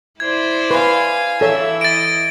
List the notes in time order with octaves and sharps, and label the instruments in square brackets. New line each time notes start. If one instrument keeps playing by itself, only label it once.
[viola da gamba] E4 C5 D5 [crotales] G#6
[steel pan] B4 [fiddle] F5 G#5
[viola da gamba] E3 E4 [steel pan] A4 C#5 [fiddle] E5
[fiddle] D#5 [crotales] A6 D7